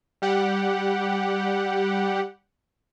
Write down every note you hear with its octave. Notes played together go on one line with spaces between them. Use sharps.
G3 G4 F#5